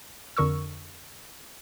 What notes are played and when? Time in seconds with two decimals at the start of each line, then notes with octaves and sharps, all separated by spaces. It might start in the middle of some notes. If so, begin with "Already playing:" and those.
0.37 F2 D3 A#4 C#6 E6